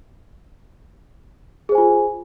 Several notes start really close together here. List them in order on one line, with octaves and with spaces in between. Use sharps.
G#4 C5 G#5 F4